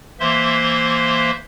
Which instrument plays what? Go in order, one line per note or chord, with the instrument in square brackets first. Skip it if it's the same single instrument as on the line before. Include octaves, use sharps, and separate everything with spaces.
[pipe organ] E3 A#3 C5 E5 C6